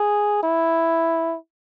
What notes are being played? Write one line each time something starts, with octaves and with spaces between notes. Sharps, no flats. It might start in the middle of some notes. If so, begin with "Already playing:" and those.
Already playing: G#4
E4